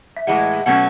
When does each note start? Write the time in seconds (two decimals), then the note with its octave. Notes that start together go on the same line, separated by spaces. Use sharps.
0.17 E5
0.27 A2 E3 G#3 F#5
0.66 B2 F#3 A3 C#4 F#5